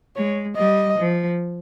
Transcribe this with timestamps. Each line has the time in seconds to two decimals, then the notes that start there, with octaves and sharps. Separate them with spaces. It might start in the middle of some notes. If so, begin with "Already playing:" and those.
0.16 G#3 C#5
0.57 G3 D#5
0.98 F3